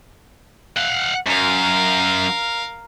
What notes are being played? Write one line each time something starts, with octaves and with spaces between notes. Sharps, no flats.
F5 F#5
F#2 A#4 F5